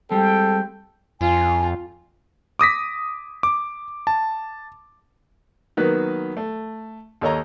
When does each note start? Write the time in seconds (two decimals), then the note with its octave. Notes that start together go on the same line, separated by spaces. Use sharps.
0.11 G3 G#3 C4 A4 G5
1.21 F2 F4 G#5
2.59 D6 D#6 A#6 B6
3.43 D6
4.07 A5
5.77 D#3 F#3 A#3 B3 B4
6.37 A3
7.21 D#2 A4 C#5 D#5 A#5